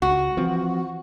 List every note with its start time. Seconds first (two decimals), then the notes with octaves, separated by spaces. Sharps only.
0.02 C#2 F#4
0.37 E3 F3 C4